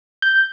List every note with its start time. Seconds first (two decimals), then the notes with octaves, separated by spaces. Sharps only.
0.22 G6